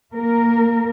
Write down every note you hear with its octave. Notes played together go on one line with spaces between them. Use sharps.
A#3 A#4